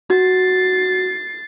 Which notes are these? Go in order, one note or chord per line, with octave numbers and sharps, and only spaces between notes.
F#4 A6 C7